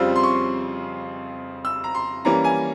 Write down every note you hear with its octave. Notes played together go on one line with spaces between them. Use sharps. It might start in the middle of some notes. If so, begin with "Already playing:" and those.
Already playing: F2 C#3 G3 C4 F4 E6
C6
C#6
E6
A#5
C6
E3 G3 A#3 C#4 A#5
G#5